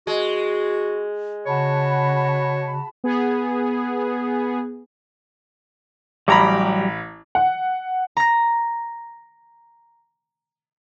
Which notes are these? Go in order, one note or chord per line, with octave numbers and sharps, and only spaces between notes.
G#3 F#4
C#3 F#4 C#5 A5 B5
B3 G#4
A1 F#3 G3 G4 A#5 B5
F#5
A#5 A#6